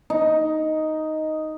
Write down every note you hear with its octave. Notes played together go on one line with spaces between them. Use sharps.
D#4